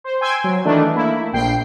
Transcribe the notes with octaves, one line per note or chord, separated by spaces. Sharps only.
C5
G5 G#5 C6 E6 G#6
F#3
D#3 E3 A3 D4
A3 A#3 E4
A#1 G5 C7